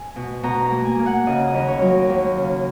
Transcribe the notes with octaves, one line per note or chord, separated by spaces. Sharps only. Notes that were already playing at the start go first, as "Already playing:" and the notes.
Already playing: G#5
B2
B2 A#5
A#5
A#3
G#5
A#3
F#5
C#3 D#5
D#5
D#2
C#5
F#3
A#4
D#2
C#3